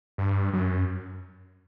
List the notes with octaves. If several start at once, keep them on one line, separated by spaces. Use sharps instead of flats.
G2
F#2